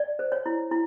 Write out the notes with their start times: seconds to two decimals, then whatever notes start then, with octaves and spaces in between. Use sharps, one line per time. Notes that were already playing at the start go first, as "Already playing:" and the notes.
Already playing: D5
0.19 C5
0.32 C#5
0.46 E4
0.71 E4